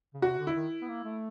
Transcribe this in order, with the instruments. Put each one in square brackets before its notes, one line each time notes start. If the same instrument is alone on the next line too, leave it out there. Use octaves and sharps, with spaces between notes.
[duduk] C#3
[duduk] C3 [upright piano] F#4
[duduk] D3
[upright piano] E4
[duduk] D#3
B3
A#3
A3